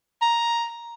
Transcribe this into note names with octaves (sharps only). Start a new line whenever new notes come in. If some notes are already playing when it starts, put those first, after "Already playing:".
A#5